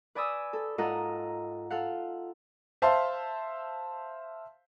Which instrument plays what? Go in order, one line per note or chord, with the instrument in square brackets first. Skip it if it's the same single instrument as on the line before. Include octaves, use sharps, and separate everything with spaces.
[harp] B4 D5 G#5 B5 D#6 E6
A4
G#2 F4 A4 A#4 D#5 F#5
F4 A4 F5 F#5
[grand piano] C5 E5 F5 A5 C6